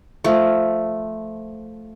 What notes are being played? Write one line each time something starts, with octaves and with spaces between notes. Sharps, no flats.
F3 A3